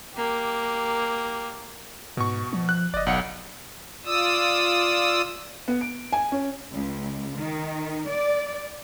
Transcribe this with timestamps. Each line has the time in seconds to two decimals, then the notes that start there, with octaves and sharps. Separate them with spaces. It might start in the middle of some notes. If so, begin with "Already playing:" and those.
0.14 A#3 G4
2.17 G#2 B2 C#6
2.53 F3
2.69 F#6
2.94 F#1 D5 D#5
3.06 B1 F#5 C#7
4.05 F4 D5 D#6 E6
5.68 B3
5.81 D7
6.13 G#5
6.32 C#4
6.73 C#2
7.37 D#3
8.08 D5